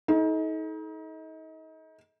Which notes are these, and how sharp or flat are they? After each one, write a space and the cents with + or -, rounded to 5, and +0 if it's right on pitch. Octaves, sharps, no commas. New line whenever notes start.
D#4 +35 A4 -35